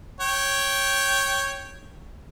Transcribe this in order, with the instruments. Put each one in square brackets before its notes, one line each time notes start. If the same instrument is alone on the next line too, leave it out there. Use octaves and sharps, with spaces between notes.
[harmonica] C#5 G5